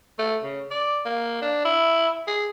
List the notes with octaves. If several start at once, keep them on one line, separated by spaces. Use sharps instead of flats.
A3
C#3
D5
A#3
D4
E4
G#4